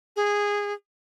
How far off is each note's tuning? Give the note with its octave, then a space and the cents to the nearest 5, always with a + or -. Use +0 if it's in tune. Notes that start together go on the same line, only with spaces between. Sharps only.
G#4 -15